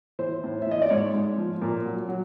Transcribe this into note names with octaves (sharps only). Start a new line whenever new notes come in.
E3 C5
A2
E5
E3 D#5
D5
G#2 C#5
G#2
F3
A#2
F#3
F#3